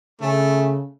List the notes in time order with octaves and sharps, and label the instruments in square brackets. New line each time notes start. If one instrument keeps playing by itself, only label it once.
[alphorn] C#3 [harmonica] A3